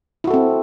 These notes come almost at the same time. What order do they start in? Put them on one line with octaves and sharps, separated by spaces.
E4 F#4 A4 C4